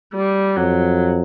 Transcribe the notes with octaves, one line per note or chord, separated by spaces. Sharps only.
G3
F2 F#3